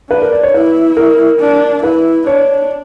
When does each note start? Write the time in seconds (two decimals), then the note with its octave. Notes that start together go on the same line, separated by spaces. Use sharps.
0.10 D4 B4
0.22 A#4
0.32 D5
0.43 C#5
0.54 E4 B4
0.97 A#4
1.40 D4
1.83 E4 B4
2.27 D4 C#5